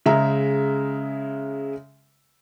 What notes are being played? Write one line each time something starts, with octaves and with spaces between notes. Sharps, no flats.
C#3 G#3 E5 A#5